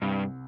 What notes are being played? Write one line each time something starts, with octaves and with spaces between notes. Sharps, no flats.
C2 G2